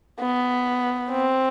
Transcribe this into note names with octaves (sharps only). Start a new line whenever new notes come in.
B3
C4